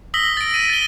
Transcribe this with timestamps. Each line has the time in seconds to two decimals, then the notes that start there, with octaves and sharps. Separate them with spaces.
0.14 D#6 E6 A#6 B6 F#7 G7
0.37 A6 D7
0.54 B6 D#7
0.70 A6 G7